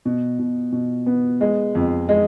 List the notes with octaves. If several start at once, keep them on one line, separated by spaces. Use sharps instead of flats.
B2
B2
B2
B3
G#3
F2
G#3